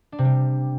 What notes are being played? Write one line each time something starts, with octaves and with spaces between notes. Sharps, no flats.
D4
C3
G3